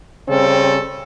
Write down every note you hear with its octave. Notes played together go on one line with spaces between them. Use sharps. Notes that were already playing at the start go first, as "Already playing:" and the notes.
C#3 G3 C4 C#4 A4